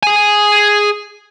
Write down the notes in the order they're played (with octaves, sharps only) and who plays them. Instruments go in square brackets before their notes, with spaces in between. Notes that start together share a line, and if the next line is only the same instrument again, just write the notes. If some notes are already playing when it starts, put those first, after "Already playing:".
[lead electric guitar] G#4 G#5